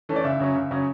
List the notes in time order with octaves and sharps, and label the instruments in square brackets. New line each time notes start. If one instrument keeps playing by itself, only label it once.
[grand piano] E3 A3 C#4
D5
C#2 E5
C#3 F#3 C#4
C#2
C#3 F#3 C#4